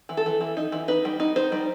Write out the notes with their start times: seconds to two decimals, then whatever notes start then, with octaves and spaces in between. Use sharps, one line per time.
0.09 E3
0.17 A4
0.26 E3
0.41 E3
0.57 D#4
0.72 E3
0.88 D#4 B4
1.05 G3
1.20 D#4
1.36 D#4 C5
1.52 G3